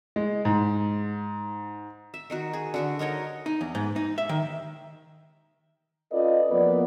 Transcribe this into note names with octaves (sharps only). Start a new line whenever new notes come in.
G#3
G#2
E5
D#3 D#4 F#4
G#4
D3 F#4 E5
D#4 A#4 C#5 D#5
D#4
E2
G#2
D#4
E5
D#3
C#4 F4 A4 B4 D5 D#5
E2 F3 A#3 B3 B4 D5